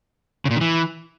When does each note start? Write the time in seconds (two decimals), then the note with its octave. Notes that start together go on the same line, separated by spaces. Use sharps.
0.45 C#3
0.51 A#2
0.56 D#3
0.61 E3